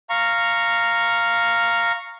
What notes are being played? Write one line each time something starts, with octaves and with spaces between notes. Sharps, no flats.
F5 A#5 C#6